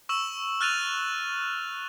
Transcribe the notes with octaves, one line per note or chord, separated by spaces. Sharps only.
C#6 E6 E7 F#7
F6 F#6 A6 D#7 F7